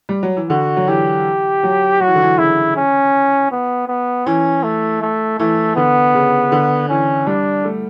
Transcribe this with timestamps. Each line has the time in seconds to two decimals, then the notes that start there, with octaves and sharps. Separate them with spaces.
0.09 G3
0.23 F#3
0.37 E3
0.50 D3 F#4
0.77 F#3
0.87 E3 G4
1.63 F#3
2.00 F#3 F#4
2.07 E3
2.15 D3
2.22 E3
2.38 C#3 E4
2.76 C#4
3.52 B3
3.88 B3
4.26 E3 C#4
4.64 A3
5.02 A3
5.39 E3 A3
5.76 D3 B3
6.14 C#3
6.52 D3
6.89 E3 C#4
7.27 G3 D4
7.64 A3